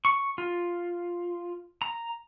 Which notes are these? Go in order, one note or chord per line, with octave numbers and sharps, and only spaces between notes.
C#6
F4
A#5